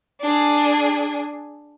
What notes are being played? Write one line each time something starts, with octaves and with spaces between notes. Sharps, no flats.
D4 G#4